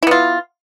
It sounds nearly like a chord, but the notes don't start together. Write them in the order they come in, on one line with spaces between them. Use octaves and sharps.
E4 B3 F4